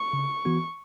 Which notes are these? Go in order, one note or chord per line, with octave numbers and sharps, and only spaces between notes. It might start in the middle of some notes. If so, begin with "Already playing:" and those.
Already playing: C#6
C#3
E3 B3 F#4